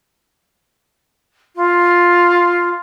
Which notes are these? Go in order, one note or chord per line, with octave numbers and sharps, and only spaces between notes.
F4